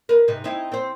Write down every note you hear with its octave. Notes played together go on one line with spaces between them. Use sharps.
A#4 B4
G#2 C3 D#4
C4 D#4 E4
C4 C5